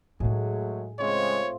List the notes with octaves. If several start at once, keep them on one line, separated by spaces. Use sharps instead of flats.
A2 F#3 G#3 A3 D#4 G#4
C#3 G#3 A3 C4 F4 C#5